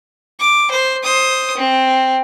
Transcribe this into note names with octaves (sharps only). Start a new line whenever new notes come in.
D6
C5
C5 D#6
C4